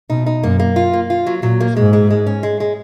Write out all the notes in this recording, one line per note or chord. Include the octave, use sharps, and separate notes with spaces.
B2 D#4
D#4
F#2 A#3
A#3
F4
A#3
F4
F#3
A#2 F#3
A#3
G#2 G#3
G#3
G#3
C#4
G#3
G#3